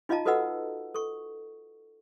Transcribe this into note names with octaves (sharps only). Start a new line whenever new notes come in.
D#4 F4 D#5 F5 A5 A#5
F#4 A4 B4 D#5 F#5 E6
A4 C#6